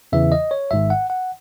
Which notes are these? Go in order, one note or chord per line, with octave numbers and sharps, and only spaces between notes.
E2 C#3 E3 E5
D#5
C#5
G#1 G#2 D#3 E5
F#5
F#5